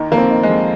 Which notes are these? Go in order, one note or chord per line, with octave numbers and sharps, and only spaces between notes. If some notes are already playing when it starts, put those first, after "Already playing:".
Already playing: D#2 D#3
F2 A#3
C4
D#3
G#3
F2